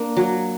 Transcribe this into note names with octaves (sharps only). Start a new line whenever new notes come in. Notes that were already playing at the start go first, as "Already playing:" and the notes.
Already playing: A#3 D4
F#3